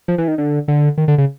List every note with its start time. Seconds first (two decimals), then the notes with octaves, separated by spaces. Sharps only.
0.08 F3
0.18 E3
0.28 D#3
0.38 D3
0.68 D3
0.98 D#3
1.08 D3
1.18 C#3